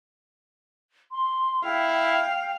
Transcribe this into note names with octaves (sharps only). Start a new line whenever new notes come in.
C6
E4 F5 G5